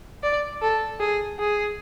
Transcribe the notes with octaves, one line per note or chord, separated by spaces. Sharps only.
D5
A4
G#4
G#4